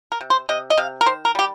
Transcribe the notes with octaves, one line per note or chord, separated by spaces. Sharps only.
A#4
C3
C5
C3 D#5
D#5
C3 F5
A#4
D#3 C5
A#4
G3 G4